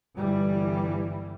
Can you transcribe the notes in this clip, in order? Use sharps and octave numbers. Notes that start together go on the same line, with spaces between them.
G1 E3 G3